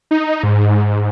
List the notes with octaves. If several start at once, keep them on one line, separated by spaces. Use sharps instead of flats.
D#4
G#2